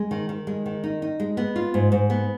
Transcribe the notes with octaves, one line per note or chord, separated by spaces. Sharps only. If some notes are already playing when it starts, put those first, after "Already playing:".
Already playing: G#3
D#3
D#3
G#3
D#3
D#4
D#4
G#3
B3
F4
G#2
G#2
B3